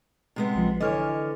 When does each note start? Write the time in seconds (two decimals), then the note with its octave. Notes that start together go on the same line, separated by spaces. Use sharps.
0.36 C3 G#3 B3
0.55 A#1 F3
0.81 D3 E3 C#5 D#5 F6